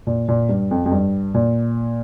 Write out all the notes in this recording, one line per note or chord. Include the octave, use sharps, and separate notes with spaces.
A#2
A#2
G2
F2
F2
G2
A#2